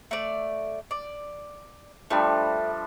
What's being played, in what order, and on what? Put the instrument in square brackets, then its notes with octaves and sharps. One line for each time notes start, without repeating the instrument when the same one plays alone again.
[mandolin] A3 D5
D5
[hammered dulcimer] F3 G3 D4 [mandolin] A3